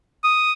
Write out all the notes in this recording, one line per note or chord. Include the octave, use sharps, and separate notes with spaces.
D#6